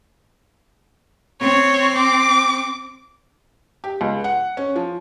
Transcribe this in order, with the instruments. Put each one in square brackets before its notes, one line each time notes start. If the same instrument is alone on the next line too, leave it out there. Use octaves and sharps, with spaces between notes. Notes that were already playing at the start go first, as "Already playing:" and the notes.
[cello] C4 [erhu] C#5
[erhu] D6
[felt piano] G4
C#2
F#5
C#4
F3